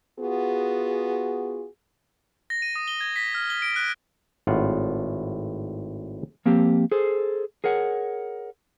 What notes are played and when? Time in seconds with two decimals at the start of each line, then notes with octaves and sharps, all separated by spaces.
0.19 B3 F4 F#4 G#4
2.50 A#6
2.62 D#7
2.76 D#6
2.88 G7
3.01 G#6
3.16 B6
3.35 F6
3.50 G7
3.62 D7
3.76 F#6
4.47 G#1 A2 F4 F#5
6.46 F3 A#3 C4 G4
6.91 G#4 A4 C5
7.64 G#4 A#4 C#5 F#5